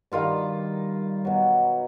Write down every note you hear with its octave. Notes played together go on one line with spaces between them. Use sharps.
G2 D#3 G3 F4
B2 F#3